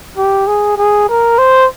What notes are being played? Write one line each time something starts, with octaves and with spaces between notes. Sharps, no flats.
G4
G#4
G#4
A#4
C5